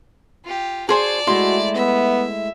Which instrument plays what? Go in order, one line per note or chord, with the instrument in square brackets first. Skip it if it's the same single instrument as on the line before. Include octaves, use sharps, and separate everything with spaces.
[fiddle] F4 G4
[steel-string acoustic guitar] F#4 [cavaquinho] G#4 C5 G#5 [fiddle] D5 A5
[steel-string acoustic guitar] G#3 A3 E4 [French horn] F#4 [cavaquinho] C6
[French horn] B3 [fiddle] E5